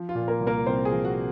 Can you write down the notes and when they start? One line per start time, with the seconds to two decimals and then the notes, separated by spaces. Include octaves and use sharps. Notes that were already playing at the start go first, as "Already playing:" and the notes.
Already playing: F3
0.09 F4
0.15 A#2
0.28 A#3 A#4
0.40 C2
0.47 A#3 A#4
0.66 C2 C4 C5
0.85 G#4 G#5
0.92 F3
1.05 F#4 F#5